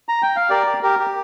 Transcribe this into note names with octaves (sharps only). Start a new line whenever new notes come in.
A#5
G5
F5
G4 A#4 D5
G4
G4 A#4
G4